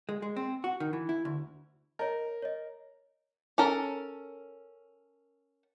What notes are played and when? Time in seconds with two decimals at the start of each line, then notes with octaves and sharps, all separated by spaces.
0.09 G#3
0.22 G#3
0.36 C4
0.64 F#4
0.80 D#3
0.93 E3
1.09 E4
1.25 D2
1.99 A#4 C#5 D#5
2.42 C#5 D#5
3.58 C#4 A4 A#4